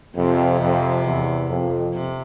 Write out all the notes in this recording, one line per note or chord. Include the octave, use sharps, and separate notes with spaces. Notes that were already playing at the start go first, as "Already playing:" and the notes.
F2 C3
F2
E2
F2
C3